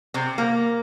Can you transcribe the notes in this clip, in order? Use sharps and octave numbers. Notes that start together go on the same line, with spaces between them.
C3 C4
A#3